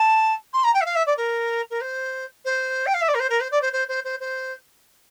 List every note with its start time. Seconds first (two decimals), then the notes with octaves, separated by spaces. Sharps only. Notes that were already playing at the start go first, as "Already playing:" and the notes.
Already playing: A5
0.53 C6
0.64 A#5
0.74 G5
0.81 E5
0.85 F5
0.95 E5
1.06 D5
1.17 A#4
1.70 A#4
1.81 C5
2.45 C5
2.86 G5
2.94 F5
3.01 E5
3.08 D5
3.14 A#4
3.19 C5
3.30 A#4
3.40 C5
3.51 D5
3.61 C5
3.73 C5
3.88 C5
4.04 C5
4.20 C5